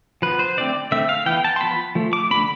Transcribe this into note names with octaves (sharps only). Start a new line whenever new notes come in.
F3 B3 B4
C5
D3 A3 C4 D5
D3 A3 C4 E5
F5
E3 B3 G5
A5
C6
F3 B3 B5
F3 A3
D6
D3 A3 C4 B5